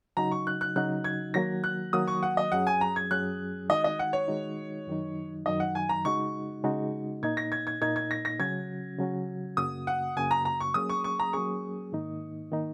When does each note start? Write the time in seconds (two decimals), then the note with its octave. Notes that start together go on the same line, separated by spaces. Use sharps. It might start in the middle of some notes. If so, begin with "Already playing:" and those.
0.17 C#3 F#3 D#4 F#4 A#5
0.32 C#6
0.47 F#6
0.61 F#6
0.76 C#3 F#3 D#4 F#4 F#6
1.04 G#6
1.34 D#3 F#3 A#3 F#4 A#6
1.64 F#6
1.93 D#3 F#3 A#3 F#4 D#6
2.07 C#6
2.23 F#5
2.37 D#5
2.52 F#2 F#3 C#4 G#4 F#5
2.67 G#5
2.81 A#5
2.96 G#6
3.11 F#2 F#3 C#4 G#4 F#6
3.69 D#3 G#3 D#4 F#4 D#5
3.84 D#5
3.99 F#5
4.13 C#5
4.28 D#3 G#3 D#4 F#4
4.87 F#2 D#3 F#3 D#4
5.46 F#2 D#3 F#3 D#4 D#5
5.60 F#5
5.75 G#5
5.89 A#5
6.05 C#3 G#3 D#4 F#4 C#6
6.64 C#3 G#3 D#4 F#4
7.23 A#2 A#3 D#4 G#6
7.37 A#6
7.52 G#6
7.67 G#6
7.81 A#2 A#3 D#4 G#6
7.96 G#6
8.11 A#6
8.25 A#6
8.39 C#3 F#3 C#4 F#4 G#6
8.98 C#3 F#3 C#4 F#4
9.57 F#2 C#3 A#3 F#4 D#6
9.87 F#5
10.17 F#2 C#3 A#3 F#4 G#5
10.31 A#5
10.45 A#5
10.60 C#6
10.74 F#3 A#3 C#4 G#4 D#6
10.89 C#6
11.04 C#6
11.19 A#5
11.33 F#3 A#3 C#4 G#4 C#6
11.92 G#2 D#3 A#3 D#4
12.52 D#3 A#3 D#4